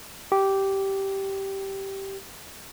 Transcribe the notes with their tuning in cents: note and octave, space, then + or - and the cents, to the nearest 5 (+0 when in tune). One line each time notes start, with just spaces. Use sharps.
G4 -10